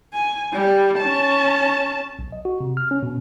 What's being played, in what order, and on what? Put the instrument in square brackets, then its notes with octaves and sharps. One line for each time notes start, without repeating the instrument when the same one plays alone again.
[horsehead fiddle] G#5
G3
C#4 A5
[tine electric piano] B1
D#5
F#4
C3
F6
C#4
B2